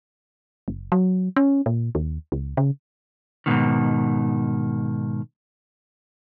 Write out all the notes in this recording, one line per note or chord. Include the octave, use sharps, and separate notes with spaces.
F#1
F#3
C#4
A#2
D#2
C#2
C#3
G#2 B2 D#3